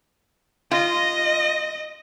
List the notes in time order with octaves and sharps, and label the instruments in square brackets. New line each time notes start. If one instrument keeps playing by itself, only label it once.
[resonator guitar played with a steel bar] F4 [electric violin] D#5